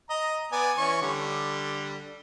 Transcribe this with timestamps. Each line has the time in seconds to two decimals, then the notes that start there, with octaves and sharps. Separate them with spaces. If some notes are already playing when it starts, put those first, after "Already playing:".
0.10 D#5 A#5
0.52 B3 D5 G#5
0.77 E3 C#4 C#6
1.02 D3 G3